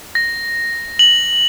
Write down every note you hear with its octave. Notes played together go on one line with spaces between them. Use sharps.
A#6
F#7